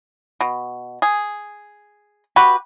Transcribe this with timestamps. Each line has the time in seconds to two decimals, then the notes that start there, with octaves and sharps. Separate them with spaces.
0.41 B2
1.02 G#4
2.36 F#4 G4 B4